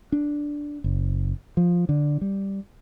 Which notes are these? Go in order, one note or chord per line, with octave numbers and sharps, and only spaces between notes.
D4
F#1
F3
D3
G3